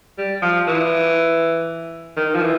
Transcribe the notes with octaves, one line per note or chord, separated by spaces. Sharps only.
G3
F3
E3
D#3
F3
E3